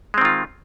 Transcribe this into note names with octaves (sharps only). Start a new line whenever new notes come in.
D#3 G#3 C4 F4